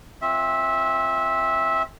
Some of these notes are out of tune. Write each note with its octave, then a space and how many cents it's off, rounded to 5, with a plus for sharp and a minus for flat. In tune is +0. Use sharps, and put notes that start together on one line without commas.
C4 +25 F4 +0 E5 -15